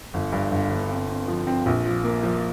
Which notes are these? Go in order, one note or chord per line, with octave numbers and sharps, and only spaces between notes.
G1
G2
G1
G1
C4
C4
F3
C4
A#1
F3
A#3
F3